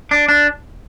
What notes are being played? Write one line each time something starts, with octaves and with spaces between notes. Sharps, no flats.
D4
D4